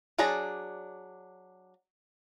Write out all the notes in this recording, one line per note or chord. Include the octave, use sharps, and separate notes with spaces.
F#3 D4 G#4 D5 A#5